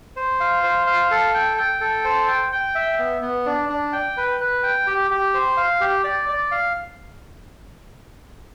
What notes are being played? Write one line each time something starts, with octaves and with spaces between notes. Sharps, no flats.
C5
F5
C5
F5
A4
G5
G5
A4
C5
G5
G5
E5
B3
B3
D4
D4
G5
B4
B4
G5
G4
G4
C5
F5
G4
D5
D5
F5